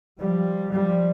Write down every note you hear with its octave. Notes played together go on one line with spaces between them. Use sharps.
F3 G3
F3 G3